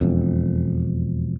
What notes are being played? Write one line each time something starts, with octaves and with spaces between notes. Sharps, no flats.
E1 F2